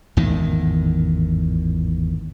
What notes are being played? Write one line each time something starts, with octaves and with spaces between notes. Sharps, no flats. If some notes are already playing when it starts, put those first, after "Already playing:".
G#1 E2 A2 D#3